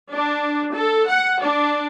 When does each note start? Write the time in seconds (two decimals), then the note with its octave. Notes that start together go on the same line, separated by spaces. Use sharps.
0.14 D4
0.74 A4
1.08 F#5
1.42 D4